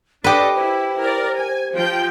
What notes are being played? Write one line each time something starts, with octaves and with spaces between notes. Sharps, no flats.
D4 G4 A4 B4 D5 D#5
E4 C5
A#4 D5
G#5
F3 G5